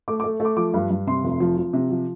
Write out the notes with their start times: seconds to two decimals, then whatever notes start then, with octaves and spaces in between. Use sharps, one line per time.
0.08 A3 D6
0.20 D6
0.24 A3
0.40 A3
0.45 D6
0.57 F3 D6
0.74 G2
0.90 G2
1.07 C3 C6
1.24 F1
1.40 F3
1.57 F3
1.73 C3
1.90 F3